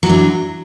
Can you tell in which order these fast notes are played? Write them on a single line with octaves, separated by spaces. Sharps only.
F#3 E3 D4